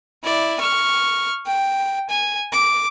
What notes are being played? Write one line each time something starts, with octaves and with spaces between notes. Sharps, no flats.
E4 D5
C#6 F6
G5
G#5
D6